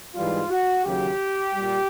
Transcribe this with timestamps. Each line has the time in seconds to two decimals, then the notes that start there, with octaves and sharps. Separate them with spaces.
0.14 G#2 E3 G3 F4
0.50 F#4
0.85 D#2 C#3 F#3 G4
1.54 A#2 G3